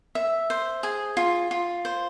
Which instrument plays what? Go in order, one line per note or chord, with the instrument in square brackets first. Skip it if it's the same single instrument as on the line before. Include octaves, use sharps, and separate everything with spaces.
[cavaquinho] E5
C5
G#4
F4
F4
C5